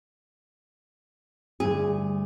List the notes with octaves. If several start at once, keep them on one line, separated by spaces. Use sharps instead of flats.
D2 G2 G#4